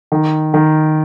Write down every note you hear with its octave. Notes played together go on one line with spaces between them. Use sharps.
D#3
D#3